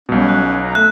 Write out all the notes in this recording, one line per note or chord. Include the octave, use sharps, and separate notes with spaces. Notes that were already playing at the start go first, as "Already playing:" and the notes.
B1 B2 G3 C#4
F#6
A#5
A3 E5 F#6